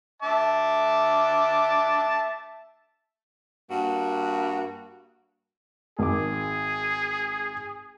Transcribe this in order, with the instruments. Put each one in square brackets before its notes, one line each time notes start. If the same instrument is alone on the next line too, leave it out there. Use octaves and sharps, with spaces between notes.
[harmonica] E5 A5 D6
[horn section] G2 A#3 F#4
[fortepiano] G#1 D6 [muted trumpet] G#4